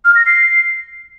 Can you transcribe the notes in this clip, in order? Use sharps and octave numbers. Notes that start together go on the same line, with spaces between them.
F6
A#6
C7